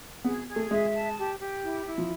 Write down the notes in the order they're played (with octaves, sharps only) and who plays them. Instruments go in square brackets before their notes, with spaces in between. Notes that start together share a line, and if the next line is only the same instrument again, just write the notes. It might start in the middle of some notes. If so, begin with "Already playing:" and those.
[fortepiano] B3 [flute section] G#4
[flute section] G#4
[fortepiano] A3
[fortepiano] G#3 [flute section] E5
[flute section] A5
G4
G4
E4
E4
[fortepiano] F3